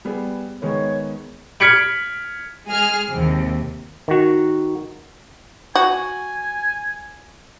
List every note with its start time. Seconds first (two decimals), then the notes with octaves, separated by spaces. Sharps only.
0.05 G3 B3 G#4
0.62 D#3 G#3 B3 C#5
1.60 F6 G#6 B6 C#7 D7 F#7
2.67 G#3 G#4 F6
3.10 D#2 C3
4.08 D#3 F#4
5.75 F#4 G#5